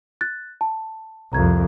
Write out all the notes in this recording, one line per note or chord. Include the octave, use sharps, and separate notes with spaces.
F#6 A6
A5
C2 F2 A#5 G#6